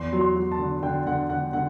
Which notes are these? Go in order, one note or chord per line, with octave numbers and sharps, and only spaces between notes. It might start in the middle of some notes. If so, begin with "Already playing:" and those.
Already playing: E2 C6
F#3
C6
F#3
A5
D3
D3 G5
D3 F#5
D3 F#5
D3 F#5